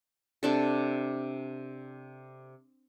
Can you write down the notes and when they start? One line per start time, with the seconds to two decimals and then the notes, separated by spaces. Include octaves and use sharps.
0.43 C3 D4 A4